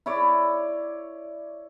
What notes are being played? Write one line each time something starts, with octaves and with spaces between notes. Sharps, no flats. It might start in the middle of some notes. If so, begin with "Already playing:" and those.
E4 C#5 D5